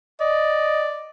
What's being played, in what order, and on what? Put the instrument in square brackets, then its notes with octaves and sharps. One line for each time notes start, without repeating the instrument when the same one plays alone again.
[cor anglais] D5 [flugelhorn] D#5